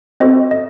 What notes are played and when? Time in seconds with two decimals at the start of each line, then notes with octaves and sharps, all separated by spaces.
0.20 C4 F#4 A4 C5 D#5
0.51 D#5